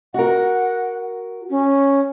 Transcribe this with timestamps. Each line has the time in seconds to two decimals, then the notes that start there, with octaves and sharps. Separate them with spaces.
0.14 F#4 A#4 F#5
1.50 C#4